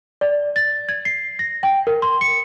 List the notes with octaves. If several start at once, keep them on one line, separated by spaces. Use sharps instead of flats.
D5
A6
G#6
C7
A#6
G5
A#4
C6
C#7